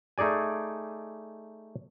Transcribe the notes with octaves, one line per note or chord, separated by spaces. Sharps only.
A3 D#4 G#4 D5 G#5